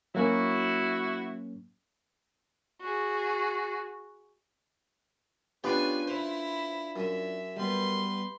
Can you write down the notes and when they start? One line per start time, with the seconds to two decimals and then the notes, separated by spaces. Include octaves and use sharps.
0.15 F#3 A#3 C#4 E4 F#4
2.81 F#4 G#4
5.64 B3 C#4 D4 F4 G4 B4 G#5
6.07 E4 C5
6.96 F#2 E5
7.57 G3 B3 B4 C6